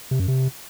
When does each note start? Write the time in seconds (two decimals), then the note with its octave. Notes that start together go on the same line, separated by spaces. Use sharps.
0.11 C3
0.20 F#2
0.28 C3